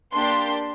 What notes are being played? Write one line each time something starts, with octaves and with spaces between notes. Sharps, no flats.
A#3 D4 G4 C6